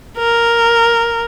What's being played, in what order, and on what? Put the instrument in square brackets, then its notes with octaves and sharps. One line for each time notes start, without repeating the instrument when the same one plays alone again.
[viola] A#4